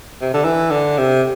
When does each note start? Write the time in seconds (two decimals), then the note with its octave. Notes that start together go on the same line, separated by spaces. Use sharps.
0.21 C3
0.33 D3
0.44 E3
0.71 D3
0.98 C3